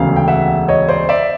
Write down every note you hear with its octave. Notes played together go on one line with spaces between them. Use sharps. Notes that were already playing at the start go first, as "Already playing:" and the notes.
Already playing: E1 D2 C#3 F5
G5
E5 F#5
C#5 D#5
C5 D5
D5 E5